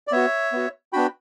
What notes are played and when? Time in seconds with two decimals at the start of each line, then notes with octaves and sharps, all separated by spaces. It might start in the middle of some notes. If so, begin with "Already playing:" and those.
0.07 D5
0.12 B3 F#4 C#5 E5
0.52 B3 F#4
0.93 B3 D4 F#4 G5 B5